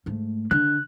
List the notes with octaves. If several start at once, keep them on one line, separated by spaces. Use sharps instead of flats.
G#2 A3
D3 F#6